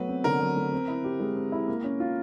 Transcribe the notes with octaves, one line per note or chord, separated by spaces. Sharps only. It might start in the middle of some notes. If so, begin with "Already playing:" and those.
Already playing: F#3 A3 B3 B4
C4
D3 A#4
F#3
A3
C4
E4
G4
G#3
C4
E4
A#3
C#4
F4